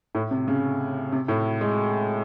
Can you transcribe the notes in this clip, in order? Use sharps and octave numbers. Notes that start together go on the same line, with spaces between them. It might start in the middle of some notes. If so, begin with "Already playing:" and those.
A2
C3
C#3
C3
A2
G#3